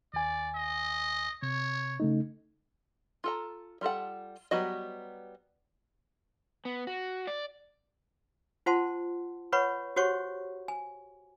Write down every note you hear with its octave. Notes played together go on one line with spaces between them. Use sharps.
D#2 D5 G#5
D#5
C3 C#5
C#3 A3 D#4
F4 A4 A#5
G3 F4 A4 F#5
F#3 G3 B3 F#4 D#5
B3
F#4
D5
F4 C5 F#5 A5 C6
B4 C#5 F#5 B5 C#6
F#4 G4 C5 C#5 F#5 C#6
G#5